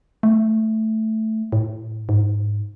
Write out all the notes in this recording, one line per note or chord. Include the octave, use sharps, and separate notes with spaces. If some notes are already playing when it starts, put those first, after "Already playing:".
A3
A2
G#2